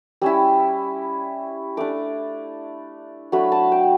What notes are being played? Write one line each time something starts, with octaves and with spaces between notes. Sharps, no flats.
G3 C#4 E4 E6
A3 D4 D6
F#3 A3 D4 B5
A5
G5